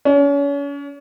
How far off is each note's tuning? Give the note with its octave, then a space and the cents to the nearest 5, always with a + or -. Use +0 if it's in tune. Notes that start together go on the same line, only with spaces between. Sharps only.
C#4 +35